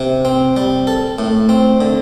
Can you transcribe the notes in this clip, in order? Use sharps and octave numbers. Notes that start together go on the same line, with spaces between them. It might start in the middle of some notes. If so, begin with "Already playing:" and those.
Already playing: C3
C4
G3
A4
A2
C4
D3